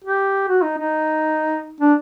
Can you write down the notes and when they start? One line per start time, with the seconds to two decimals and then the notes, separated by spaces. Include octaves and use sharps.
0.04 G4
0.48 F#4
0.62 D#4
0.78 D#4
1.80 D4